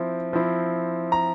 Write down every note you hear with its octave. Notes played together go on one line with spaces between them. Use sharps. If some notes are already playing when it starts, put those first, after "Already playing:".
Already playing: F3 C4 E4
F3 C4 E4
A#5